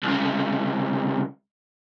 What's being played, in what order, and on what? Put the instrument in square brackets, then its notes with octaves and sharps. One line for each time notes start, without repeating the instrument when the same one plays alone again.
[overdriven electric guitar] C2 C#3